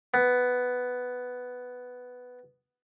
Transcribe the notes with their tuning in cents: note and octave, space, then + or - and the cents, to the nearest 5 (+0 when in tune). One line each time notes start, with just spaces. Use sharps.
B3 +5